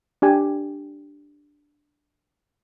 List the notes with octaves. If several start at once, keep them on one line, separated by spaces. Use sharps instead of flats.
D4 G4 G#5